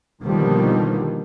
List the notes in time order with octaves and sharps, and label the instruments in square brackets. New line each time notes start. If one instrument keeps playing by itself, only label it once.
[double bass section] B2 D3 D#3 F3 G3 A#3